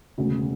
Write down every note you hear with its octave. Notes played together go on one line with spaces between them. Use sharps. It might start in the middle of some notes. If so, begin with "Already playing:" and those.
E1 D2 C#3